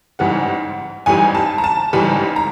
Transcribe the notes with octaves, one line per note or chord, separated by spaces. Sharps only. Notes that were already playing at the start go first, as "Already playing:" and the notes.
A1 G#2 E3 G3 F#5
A1 G#2 E3 G3 G#5
A5
A#5
A5
A1 G#2 E3 G3 B5
A#5